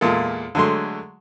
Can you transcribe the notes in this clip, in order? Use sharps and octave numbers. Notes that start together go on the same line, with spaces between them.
E2 A#2 G#3 F4 A4
D3 F#3 G#3 A3 C6